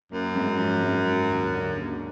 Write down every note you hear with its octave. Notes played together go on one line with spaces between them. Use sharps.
F#2 A#3
G#2
F3
G#2
F#3
D#2
D3
A#3